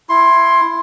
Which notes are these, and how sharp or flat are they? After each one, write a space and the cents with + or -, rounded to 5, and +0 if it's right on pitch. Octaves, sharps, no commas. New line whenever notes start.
E4 +15 C6 +15